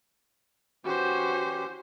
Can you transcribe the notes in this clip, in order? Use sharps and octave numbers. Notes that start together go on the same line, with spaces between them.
E3 C#4 F#4 G4 C5